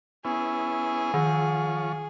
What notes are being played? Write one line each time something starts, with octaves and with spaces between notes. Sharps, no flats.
B3 C#4 E4 G#4
D#3 F3 C#5